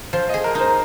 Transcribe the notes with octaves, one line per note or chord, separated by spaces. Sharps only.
F3 C5
G#4 D#5
A#4
D#4 A#4 C5